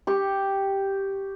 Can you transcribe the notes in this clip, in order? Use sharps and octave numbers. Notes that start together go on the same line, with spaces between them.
G4 C#6